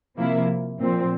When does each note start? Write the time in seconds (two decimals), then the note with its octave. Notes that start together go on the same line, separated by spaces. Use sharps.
0.17 C3 F3 A#3 E4
0.80 A#2 F3 C4